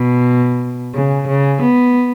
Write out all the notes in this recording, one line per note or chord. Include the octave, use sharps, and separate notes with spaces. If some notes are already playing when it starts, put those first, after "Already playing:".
Already playing: B2
C#3
C#3
B3